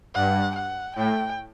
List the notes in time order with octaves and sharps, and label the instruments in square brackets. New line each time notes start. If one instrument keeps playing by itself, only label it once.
[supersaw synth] G2 [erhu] F#5
[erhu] F#5
[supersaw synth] A2 [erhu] G5